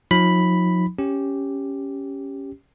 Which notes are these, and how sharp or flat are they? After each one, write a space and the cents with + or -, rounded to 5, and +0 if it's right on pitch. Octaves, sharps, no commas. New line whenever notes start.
F3 +45 D#4 +25 B5 +0
C#4 +0 G4 +0